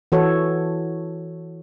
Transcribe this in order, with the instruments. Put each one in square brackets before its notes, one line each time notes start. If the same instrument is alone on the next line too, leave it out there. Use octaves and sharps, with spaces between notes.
[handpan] E3 F#4 A4 C#5